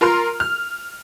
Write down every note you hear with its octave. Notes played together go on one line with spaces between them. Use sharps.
F4 A#4 A#5 C6 F6
F6